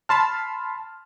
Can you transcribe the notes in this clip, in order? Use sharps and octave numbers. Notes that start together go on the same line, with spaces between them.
A5 B5 C6 F6